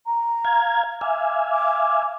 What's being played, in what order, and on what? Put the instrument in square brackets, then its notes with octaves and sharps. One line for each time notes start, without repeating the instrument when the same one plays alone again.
[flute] A#5
[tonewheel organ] F5 G#6
[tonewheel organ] E5 F5 G#5 [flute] D6
[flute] D6